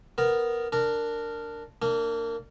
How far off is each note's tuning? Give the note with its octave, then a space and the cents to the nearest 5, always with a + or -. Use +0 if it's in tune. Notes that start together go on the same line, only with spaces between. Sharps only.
B3 +0 A#4 +0
D4 +0 A#4 -15
A#3 -20 D4 +10